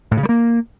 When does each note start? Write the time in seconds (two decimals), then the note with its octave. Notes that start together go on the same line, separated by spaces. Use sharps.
0.11 A2
0.17 C#3
0.23 G3
0.29 A#3